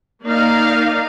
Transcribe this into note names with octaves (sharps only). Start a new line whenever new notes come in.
A#3 D#4 D5 F5